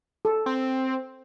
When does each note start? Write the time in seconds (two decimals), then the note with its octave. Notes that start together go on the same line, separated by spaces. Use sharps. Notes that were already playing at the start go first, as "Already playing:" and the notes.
0.25 A4
0.46 C4